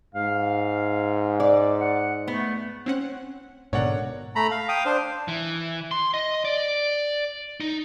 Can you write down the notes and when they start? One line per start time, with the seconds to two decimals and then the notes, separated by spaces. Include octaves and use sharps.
0.15 G#2 F5
1.40 D5
1.81 F#5
2.28 A3 B3
2.86 C4 C#4 F#5
3.73 G#2 B2 D3 A#4 C#5 D5 F#5
4.35 A3 A#5 B5
4.51 F5
4.69 F5 G5 D#6
4.86 D4 C5
5.28 E3
5.91 C6
6.14 D#5
6.45 D5
7.60 D#4